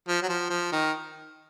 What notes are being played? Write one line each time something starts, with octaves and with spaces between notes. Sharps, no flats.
F3
F#3
F3
F3
D#3